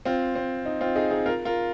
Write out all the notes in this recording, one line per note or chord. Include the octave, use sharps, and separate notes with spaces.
C4 F4
C4
D#4
C4 F4
D#4 G#4
D#4 G#4
F4 A#4
F4 A#4